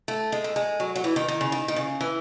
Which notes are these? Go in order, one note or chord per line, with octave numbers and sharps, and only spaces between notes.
A3
G#3
A3
G#3
F#3
F#3
E3
D#3
D#3
C#3
D#3
D#3
C#3
E3